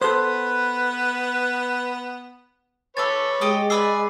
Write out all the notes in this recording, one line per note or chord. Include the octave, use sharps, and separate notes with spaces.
B3 A4 B4 C5
A4 B4 C#5 G#5 D6 A6
G#3 G4 D#5 D#6
A4 B4 D5 G#5 D6 E6 C7